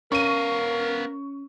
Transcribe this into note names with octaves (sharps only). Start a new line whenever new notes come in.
B3 C#4 A#4 F5 C#6 D#7